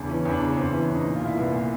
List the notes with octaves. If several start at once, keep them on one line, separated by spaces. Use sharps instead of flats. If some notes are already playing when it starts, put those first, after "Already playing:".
Already playing: E2 C#3 D4
E3 C#4
E2 D4
C#3 C#4
E2 C4
E3 C#4
D4
E2
D#4
A#2 D#4
F4
C2 E4
C2 B3
A#2